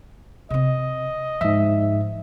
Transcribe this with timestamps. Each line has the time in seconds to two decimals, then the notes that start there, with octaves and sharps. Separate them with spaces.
0.50 C3 C4 D#5
1.41 G#2 D#3 F3 E5